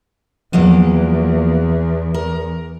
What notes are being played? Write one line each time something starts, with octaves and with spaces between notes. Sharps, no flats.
E2 F3 F#3 A#3
A#4